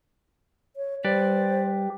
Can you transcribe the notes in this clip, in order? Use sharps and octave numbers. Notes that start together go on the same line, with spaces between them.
C#5
G3 G4 B4 C5 D5